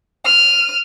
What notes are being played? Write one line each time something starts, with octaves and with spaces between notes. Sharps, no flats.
F6 D#7